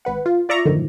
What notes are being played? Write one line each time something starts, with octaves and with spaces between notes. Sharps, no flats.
G#1 B4 F#5
F4
F4 D5 E5 A#5 C#6
C#2 F#2 A2 D3 D#3 F3